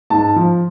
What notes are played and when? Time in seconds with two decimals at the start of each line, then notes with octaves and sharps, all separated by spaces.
0.10 G#2 A5
0.36 F3